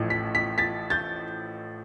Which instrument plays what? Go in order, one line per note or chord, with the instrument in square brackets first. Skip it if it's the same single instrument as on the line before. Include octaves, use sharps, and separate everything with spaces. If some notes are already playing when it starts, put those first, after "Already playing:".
Already playing: [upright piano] A1 A2 F3
B6
B6
A6 B6
G6 A6